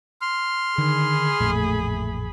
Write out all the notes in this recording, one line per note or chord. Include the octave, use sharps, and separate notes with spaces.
C6 F6
D3 D#3 G#4 B5
A1 F2 A#2 A3